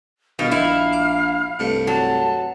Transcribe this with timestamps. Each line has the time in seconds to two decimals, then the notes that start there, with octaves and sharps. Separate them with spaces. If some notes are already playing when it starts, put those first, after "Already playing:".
0.39 G1 B2 D#3 F5
0.51 A#1 D#4 E4
0.93 D6
1.59 C2 G2 A3
1.87 F#3 A5